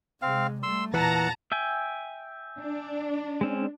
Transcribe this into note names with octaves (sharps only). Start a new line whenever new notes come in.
C3 G#3 C4 F5
G3 A3 C6 E6
E2 A#2 E3 F#5 A5 A#5
E5 G5 G#5
D4
G#3 C4 C#4